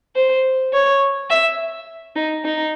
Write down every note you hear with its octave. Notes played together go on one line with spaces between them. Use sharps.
C5
C#5
E5
D#4
D#4